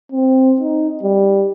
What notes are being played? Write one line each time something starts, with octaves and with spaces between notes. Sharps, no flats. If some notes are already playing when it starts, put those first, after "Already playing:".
C4
D#4
G3